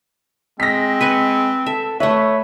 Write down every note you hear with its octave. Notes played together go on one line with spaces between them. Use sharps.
G#3 C4 A#6 B6
B4 G#5 C#6
A4 E5
A3 B4 C#5 E5